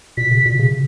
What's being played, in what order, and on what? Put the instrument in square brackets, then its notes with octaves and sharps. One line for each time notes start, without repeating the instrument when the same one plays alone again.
[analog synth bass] B2 [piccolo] B6
[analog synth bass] C#3
B2
C#3